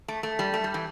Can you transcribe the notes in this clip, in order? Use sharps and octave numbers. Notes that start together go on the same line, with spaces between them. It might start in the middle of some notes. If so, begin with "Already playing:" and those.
A3
A3
G3
A3
G3
E3